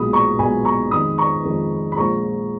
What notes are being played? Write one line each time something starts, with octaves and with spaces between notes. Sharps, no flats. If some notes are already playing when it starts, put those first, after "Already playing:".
Already playing: B1 A#2 G#3 B5 D#6
A#5 C#6
B1 A#2 G#3 G#5 B5
A#5 C#6
F2 D#3 G#3 B5 D#6
A#5 C#6
F2 D#3 G#3
B5
A#1 A#2 G#3 A#5 C#6